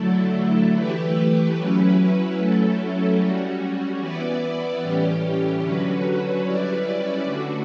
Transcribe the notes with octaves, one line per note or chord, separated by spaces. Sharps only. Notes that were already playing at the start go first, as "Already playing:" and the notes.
Already playing: D3 F#3 A3 E4 A4
E3 A3 E4 G4 B4
F#3 C#4 E4 B4
F#3 A3 C#4 E4 A4
G3 C#4 F#4
E3 B3 E4 B4 D5
A2 E3 G3 C#4 G4
D3 F#3 C#4 F#4 B4
G3 C#4 E4 B4 D5
D3 A3 D4 F#4